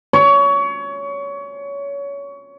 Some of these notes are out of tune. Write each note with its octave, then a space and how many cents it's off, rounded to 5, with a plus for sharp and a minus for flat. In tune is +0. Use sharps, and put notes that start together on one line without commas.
C#5 +25